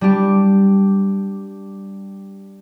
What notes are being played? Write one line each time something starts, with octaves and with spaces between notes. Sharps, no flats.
G3 D4 G4